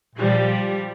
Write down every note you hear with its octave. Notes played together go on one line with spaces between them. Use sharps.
A#2 F3 G3